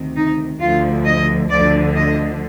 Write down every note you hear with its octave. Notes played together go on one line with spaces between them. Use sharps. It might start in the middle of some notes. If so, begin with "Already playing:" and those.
Already playing: D2 C3 D#3
D#4
D2 D3 F3 F4
D#5
D2 D3 F3 D5
D#5